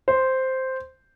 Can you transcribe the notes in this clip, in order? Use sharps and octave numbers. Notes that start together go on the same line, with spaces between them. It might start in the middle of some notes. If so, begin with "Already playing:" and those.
C5